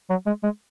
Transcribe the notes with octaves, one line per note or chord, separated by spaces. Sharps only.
F#3
G#3
G#3